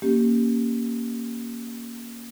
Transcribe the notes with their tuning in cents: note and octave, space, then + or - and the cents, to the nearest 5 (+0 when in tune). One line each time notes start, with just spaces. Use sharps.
A#3 +5 C#4 +0 G4 +0